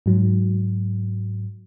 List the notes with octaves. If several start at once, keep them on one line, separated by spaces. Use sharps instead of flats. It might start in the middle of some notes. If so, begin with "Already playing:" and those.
G#2 F#3